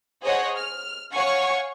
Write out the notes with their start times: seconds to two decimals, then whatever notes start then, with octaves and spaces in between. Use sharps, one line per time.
0.23 G#4 C5 C#5 D#5 F#5
0.56 F6
1.14 C#5 F5 F#5 G#5 C#6